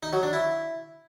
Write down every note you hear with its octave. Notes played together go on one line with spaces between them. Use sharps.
D#4
F#3
D4
E4